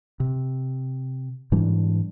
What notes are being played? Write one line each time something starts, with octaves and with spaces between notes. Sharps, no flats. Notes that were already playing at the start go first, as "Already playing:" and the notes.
C3
G#2 E3 G3 D4